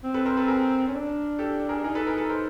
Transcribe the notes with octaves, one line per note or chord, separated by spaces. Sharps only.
C4
A4 B4
A#4 C5
A4 B4
G#4 A#4
C#4
D4
G4 A4
G#4 A#4
D#4 G#4 A#4
A4 B4
G#4 A#4
A4 B4
A#4 C5